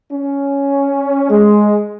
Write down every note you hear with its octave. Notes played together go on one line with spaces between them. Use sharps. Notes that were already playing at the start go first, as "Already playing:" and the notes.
C#4
G#3